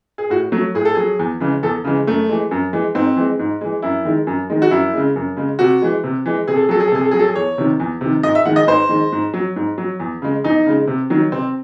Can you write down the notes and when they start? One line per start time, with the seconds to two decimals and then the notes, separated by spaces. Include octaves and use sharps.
0.18 G#4
0.30 A2 F#4
0.52 F#3 A3
0.75 A2 G#4
0.85 A4
0.95 F#3 G#4
1.19 E2
1.40 C#3 E3 G#3
1.63 E2 A4
1.84 C#3 E3 G#3
2.07 F#2 A3
2.29 E3 G#3
2.51 F#2
2.73 E3 G#3
2.95 G#2 C4
3.16 E3 G#3
3.39 G#2
3.61 E3 G#3
3.82 F#2 E4
4.05 D#3 G#3
4.27 F#2
4.50 D#3 G#3
4.62 F#4
4.71 F#2 E4
4.93 C#3 G#3
5.16 F#2
5.37 C#3 G#3
5.59 C3 F#4
5.82 E3 G#3
6.04 C3
6.26 E3 G#3
6.47 C3 G#4
6.56 A4
6.63 G#4
6.69 F#3 A4
6.80 G#4
6.87 A4
6.92 C3 G#4
7.04 A4
7.11 F#3 G#4
7.19 A4
7.28 G#4
7.35 E2 C#5
7.58 C3 D#3
7.80 E2
8.01 C3 D#3
8.23 G#2 D#5
8.35 E5
8.45 D#3 G#3 F#5
8.56 D#5
8.67 G#2 C5
8.89 D#3 G#3
9.12 G#2
9.34 F#3
9.56 G#2
9.78 F#3
10.00 E2
10.22 C#3 G#3
10.44 E2 D#4
10.66 C#3 G#3
10.87 C3
11.10 D#3 F#3
11.32 C3 C4